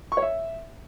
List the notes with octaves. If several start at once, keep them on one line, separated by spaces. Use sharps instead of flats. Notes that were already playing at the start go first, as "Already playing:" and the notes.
C#6
C#5
E5